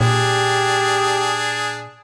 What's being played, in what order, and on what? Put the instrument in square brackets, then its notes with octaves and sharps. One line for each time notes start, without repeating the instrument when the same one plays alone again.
[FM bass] A#2 [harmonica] D4 G#4 [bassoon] G4